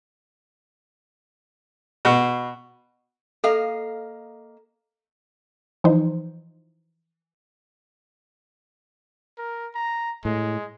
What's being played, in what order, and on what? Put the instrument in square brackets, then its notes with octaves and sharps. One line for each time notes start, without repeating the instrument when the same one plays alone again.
[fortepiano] B2
[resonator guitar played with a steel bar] A#3 D#5 F5 [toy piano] A4
[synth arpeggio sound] E3 F3 D#4 C5
[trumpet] A#4
A#5
[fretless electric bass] A2 [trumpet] G#3